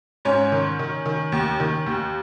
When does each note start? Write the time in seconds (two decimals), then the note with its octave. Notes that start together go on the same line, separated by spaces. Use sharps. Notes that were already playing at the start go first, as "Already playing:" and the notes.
0.25 G#2 C#4 C#5
0.52 D#3
0.79 D#3
1.06 D#3
1.32 D#2
1.60 D#3
1.86 D#2